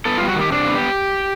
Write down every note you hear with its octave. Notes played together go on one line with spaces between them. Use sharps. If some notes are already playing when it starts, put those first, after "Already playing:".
B3 A4
G3 F4
F#4
D#3 G4
C3 D4
B3
G4